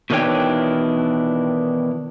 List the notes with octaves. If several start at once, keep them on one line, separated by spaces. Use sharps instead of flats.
B2 D#3 E3 D4 C#5 G5